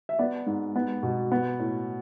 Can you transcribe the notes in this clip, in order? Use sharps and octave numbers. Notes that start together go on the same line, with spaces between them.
E5
B3 D5
G#2
B3
B2
B3
A2